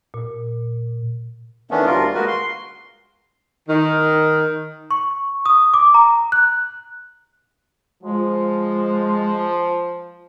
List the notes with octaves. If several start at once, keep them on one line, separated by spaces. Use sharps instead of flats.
A#2
D#3 E3 A3 B3 C#4 D4
D2 G3 F4 A#4
G#3 A#3 F#4 A#4 B4
C6
D#3
C#6
D#6
D6
A#5
F#6
F3 G#3